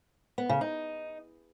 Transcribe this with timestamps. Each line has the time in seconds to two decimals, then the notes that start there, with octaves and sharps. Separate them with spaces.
0.38 B3
0.49 C#3
0.61 D#4